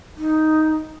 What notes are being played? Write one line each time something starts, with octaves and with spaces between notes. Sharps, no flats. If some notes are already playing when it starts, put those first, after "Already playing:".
D#4